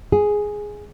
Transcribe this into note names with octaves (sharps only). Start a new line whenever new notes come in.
G#4